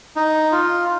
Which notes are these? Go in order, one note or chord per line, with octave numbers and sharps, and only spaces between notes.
D#4
F4